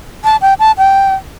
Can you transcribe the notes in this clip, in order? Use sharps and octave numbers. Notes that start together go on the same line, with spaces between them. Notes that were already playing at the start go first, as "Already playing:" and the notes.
A5
G5
A5
G5